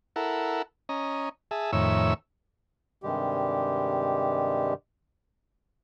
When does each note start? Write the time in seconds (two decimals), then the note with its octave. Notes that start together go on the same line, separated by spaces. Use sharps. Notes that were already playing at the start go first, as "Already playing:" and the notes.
0.16 E4 A4 A#4 F#5
0.89 C#4 D#5 A#5
1.51 G#4 E5 A5
1.73 F2 A2 D#3 C#5 E5 E6
3.03 G2 C3 D#3 G3 G#3 G4